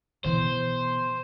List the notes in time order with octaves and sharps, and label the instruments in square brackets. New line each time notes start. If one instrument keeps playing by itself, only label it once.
[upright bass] B2 E3 [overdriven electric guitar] C5